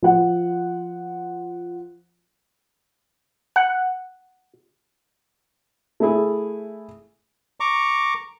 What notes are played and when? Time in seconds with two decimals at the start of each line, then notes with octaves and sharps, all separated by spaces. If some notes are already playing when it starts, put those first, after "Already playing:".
0.02 F3 F#5
3.56 F#5
6.00 A3 E4 G#4
7.60 A#5 C#6 D6